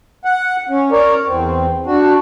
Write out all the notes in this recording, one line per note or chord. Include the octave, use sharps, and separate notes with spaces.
F#5
C#4
A#4 C#5 D5
E2 C4
D4 F#4